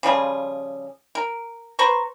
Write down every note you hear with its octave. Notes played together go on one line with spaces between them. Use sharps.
C#3 F3 G3 G#4
A#4
B4 C5 A#5 C#6